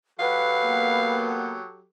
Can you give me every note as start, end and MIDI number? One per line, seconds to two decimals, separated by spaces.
0.19 1.87 54
0.19 1.87 67
0.19 1.87 69
0.19 1.35 71
0.19 1.42 77
0.19 1.35 78
0.63 1.59 58
0.63 1.59 59